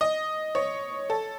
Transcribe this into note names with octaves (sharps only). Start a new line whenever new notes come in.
D#5
C#5
A4